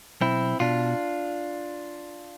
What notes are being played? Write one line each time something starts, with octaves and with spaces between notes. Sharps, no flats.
B1 C4 E4
B2 D4 F4